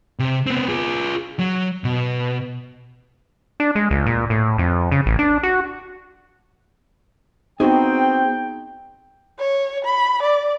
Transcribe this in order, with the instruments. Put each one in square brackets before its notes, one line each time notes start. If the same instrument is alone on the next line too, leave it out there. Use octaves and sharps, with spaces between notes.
[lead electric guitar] C3
B3 C4
F4 G#4
F#3
B2
[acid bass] D4
G#3
C#2
A#2
A2
F2
C#3
A1
D4
F#4
[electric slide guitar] B3 F#4 G#4 [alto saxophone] C4 [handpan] D#4 [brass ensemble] G5
[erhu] C#5
B5
D5